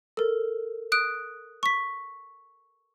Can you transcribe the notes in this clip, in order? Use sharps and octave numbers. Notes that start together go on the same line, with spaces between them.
A4 A#4
D#6 F#6 D7
C#6 B6